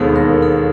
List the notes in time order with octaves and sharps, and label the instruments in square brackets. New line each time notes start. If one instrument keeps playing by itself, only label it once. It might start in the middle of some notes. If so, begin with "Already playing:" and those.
Already playing: [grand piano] E1 D#2 D#3 G#3 B3 [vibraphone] A4
[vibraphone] A#4
A4